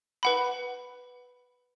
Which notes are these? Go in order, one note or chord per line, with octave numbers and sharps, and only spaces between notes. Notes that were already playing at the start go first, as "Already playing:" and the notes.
B4 F#5 B5